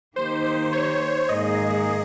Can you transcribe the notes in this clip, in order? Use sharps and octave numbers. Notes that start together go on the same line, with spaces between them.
D#3 A#3 D#4 G4 C5
C5
C#5
G#2 D#3 A#3 D#4 G#4 D#5